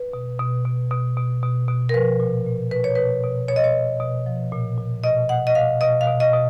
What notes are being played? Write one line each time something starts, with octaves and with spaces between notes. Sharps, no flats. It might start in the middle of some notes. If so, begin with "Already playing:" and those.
Already playing: B4
B2
B2
B2
B2
B2
B2
B2
A#4
F3 B4
A#2
A#2
B2 B4
C#5
B2 B4
B2
B2 C#5
D#5
C#5
B2
B2
F3
A#2
A#2
B2 D#5
B2 F#5
D#5
B2 F5
B2 D#5
F5
B2
D#5
B2